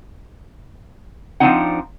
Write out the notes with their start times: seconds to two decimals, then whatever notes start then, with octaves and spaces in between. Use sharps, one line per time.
1.40 F3 A3 C4 D4 D#4 F#5